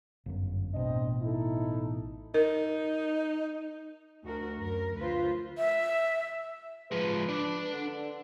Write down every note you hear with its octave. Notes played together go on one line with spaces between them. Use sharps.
G1 F#2
A1 B2 C4 D4 D#5
D#4 E4 A4
D#4 A#4
D2 F#4 A#4
F#2 A#4
D2 F3 F4 B4 C5
E5
F3 G#3 B4
D4 D5
D3